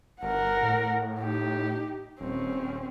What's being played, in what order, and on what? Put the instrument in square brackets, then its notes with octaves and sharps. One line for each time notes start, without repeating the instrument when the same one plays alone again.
[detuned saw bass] G1 [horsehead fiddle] A#4 F#5
[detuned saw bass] A2
[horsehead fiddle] D#4 G4
[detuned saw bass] D#1 [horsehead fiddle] C4 C#4